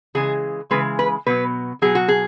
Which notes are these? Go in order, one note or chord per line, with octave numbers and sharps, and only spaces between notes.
C#3 E3 G#3 G#4
C#3 E3 G#3 B4
B4
B2 F#3 B4
B2 F#3 G#4
F#4
G#4